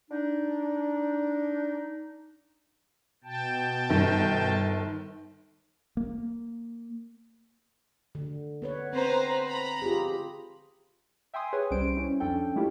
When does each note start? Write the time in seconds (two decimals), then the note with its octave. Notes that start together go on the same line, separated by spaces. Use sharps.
0.10 D4 D#4
3.24 B2 G5 A5
3.89 G1 D#3
5.97 A#3
8.15 D3
8.62 B3 B4 C#5
8.93 C4 B4 C5 A#5
9.47 A#5 B5
9.82 F4 G4 G#4
11.34 E5 G5 G#5 C6 D#6
11.53 G#4 B4 C#5 G#5
11.71 C2 G3 C#4 C5 D7
11.96 C#4 E4
12.20 F2 C#4 D4 A4 G5
12.55 G#3 A3 C#4 E4 F4 G4